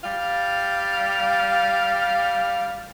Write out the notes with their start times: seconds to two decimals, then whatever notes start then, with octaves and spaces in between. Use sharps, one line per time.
0.04 G3 F5